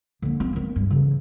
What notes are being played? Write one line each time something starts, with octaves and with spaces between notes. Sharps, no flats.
D3 A#3
C4
D#3 B3
G2
C#3 E3